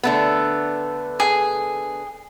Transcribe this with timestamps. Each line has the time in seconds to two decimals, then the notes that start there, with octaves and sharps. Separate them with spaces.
0.03 D3 A3 B3
1.20 G#4